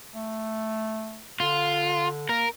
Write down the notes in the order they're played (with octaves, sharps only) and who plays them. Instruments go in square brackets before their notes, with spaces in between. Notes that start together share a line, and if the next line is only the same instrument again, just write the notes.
[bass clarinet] A3
[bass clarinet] D3 [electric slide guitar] F4
[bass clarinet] A#3 [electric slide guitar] A#4